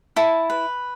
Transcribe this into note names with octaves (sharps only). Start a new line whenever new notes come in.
E4 A5
B4